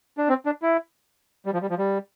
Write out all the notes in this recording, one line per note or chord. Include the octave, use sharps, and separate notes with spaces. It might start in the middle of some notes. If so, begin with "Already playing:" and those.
D4
C4
D4
E4
G3
F3
G3
F3
G3